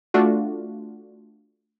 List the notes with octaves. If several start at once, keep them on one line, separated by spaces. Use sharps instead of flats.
A3 D4 F4 F#4